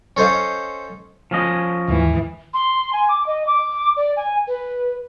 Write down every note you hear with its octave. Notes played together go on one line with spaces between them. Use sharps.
C#4 A4 C5 D#5 F5
F3 C#4 D#5
D#2 G#2 E3
C6
G#5
D6
D#5
D6
D5
G#5
B4